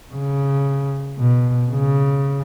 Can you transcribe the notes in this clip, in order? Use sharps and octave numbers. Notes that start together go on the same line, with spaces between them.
C#3
B2
C#3